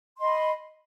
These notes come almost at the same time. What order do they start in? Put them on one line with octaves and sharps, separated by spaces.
C6 D#5 B5